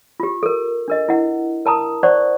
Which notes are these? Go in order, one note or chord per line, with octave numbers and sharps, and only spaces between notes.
F4 G4
A4 A#4
D4 A#4 D#5
E4 F#5
A#4 A5 A#5 D#6
C5 D5 F#5 C#6